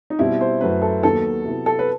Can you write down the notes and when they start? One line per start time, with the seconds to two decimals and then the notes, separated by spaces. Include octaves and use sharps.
0.10 D#4
0.19 B2 G3 C4 E4
0.41 C5
0.61 F#2 F#3 A3 B4
0.82 A4
1.03 D#2 D#3 F#3 B3 A4
1.45 C3 F#3 B3 E4
1.66 A4
1.79 B4